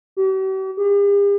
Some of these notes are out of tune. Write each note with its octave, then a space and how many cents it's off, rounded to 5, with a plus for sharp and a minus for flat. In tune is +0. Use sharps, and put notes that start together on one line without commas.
G4 -45
G4 +45